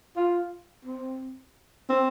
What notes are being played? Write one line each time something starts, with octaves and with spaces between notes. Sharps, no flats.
F4
C4
C4